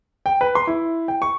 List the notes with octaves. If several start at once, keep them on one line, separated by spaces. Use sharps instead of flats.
G5
B4
C6
E4
G5
C#6